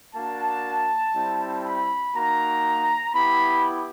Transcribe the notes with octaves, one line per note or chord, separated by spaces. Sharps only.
A#3 D4 F#4 A5
G3 C4 E4
B5
A#3 D#4 F#4 A#5
B3 E4 G4 B5